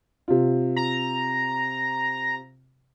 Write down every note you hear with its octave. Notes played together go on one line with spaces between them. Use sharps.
C3 F4
A#5